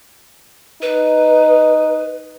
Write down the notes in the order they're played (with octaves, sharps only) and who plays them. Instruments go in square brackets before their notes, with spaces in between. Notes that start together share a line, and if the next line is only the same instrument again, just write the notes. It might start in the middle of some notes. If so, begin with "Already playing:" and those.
[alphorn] D#4 [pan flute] B4